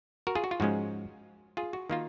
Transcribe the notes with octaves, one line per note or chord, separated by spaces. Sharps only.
F#4 A#4
F4 G#4
F#4
F4
G#2 F3 G#3 C#4 F#4
F4 G#4
F#4
D#3 A#3 F4